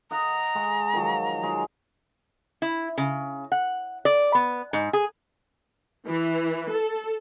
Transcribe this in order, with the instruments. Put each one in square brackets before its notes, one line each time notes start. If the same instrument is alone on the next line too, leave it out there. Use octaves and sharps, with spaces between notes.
[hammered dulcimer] D#5 F#5 [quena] A#5
[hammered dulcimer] G#3 F#5 C#6
D#3 F3 F#3
F#3 G#3 D#4
[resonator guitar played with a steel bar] E4
C#3
F#5
D5
B3
G#2
G#4
[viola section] E3
A4